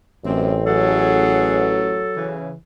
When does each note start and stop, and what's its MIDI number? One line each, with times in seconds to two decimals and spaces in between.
0.24 2.05 33
0.24 0.55 42
0.24 0.61 60
0.66 2.41 54
0.66 1.72 68
0.66 2.39 69
0.66 1.72 78
2.16 2.52 49
2.16 2.52 52